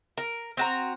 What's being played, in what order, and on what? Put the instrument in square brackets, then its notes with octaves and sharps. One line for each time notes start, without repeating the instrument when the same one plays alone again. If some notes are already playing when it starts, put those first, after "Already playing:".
[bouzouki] A#4
C4 F#4 A#5